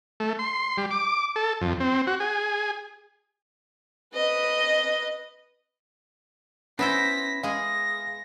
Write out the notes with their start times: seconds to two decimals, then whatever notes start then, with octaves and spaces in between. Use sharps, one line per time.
0.20 A3
0.39 C6
0.78 G3
0.91 D6
1.36 A4
1.61 F2
1.80 C4
2.07 F#4
2.20 G#4
4.14 B4 D#5
6.79 B3 C#4 E4 C5 A#6 B6
7.43 G#3 G#4 F5 A#6